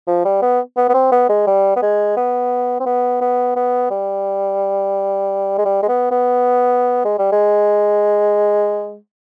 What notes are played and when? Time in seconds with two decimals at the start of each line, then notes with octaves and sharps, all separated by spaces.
0.07 F3
0.25 G3
0.42 B3
0.77 B3
0.89 B3
0.94 C4
1.12 B3
1.29 G#3
1.47 G3
1.76 B3
1.82 G#3
2.17 B3
2.80 C4
2.86 B3
3.21 B3
3.56 B3
3.90 G3
5.58 G#3
5.65 G3
5.83 G#3
5.89 B3
6.11 B3
7.05 G#3
7.18 G3
7.32 G#3